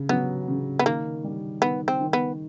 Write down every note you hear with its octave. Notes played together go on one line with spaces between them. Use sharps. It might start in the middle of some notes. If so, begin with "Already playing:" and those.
Already playing: C#3
F#3 B3
C#3
B3
D#3 A#3
G3
D#3 B3
C4
D#3
B3